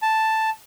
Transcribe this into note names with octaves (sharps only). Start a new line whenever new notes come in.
A5